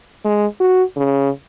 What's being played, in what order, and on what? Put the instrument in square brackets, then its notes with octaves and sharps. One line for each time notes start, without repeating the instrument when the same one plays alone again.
[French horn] G#3
F#4
C#3